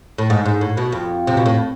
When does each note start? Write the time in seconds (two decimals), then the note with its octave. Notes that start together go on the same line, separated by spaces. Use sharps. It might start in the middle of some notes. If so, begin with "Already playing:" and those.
0.18 A2
0.30 G#2
0.46 G#2
0.61 A2
0.77 B2
0.92 F2
1.27 C3
1.37 B2
1.46 A2